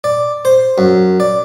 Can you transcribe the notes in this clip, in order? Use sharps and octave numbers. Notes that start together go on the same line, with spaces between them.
D5
C5
F#2
D5